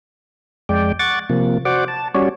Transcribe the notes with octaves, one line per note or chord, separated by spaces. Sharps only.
F2 G#3 D5 G5
F#5 C#6 D6 A6
C3 F3 A#3
F#4 C5 D5 F#5 D6
A5
G3 C#4 F#4 C#5 D5